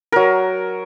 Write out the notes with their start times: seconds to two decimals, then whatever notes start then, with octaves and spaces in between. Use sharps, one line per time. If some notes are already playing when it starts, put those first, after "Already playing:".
0.12 F#3 A#4